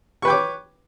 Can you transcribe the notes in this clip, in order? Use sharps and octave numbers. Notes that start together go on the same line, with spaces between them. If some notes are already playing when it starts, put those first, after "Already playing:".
B4 C#5 G5 C#6 D6